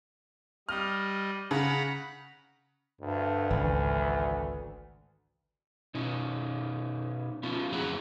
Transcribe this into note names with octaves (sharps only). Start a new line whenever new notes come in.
G3 D#5 F6
C#3 F#5 A#5 B5
D2 G2
G#1 C#2 E3
B2 C#4 D#4
B3 C#4 F4
F2 A2 F#3 G#4 F#5 A#5